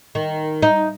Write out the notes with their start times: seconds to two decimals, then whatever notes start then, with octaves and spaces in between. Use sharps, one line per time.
0.15 D#3
0.62 D#4